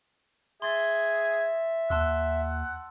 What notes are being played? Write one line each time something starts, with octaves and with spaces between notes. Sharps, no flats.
G#4 E5 C6 A6
D#2 F#5 A5 C6 E6